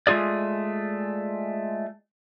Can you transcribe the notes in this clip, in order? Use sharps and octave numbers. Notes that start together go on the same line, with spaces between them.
G#3 A3 F4 G#4 D5